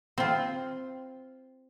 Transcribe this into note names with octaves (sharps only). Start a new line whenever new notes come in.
C4 F4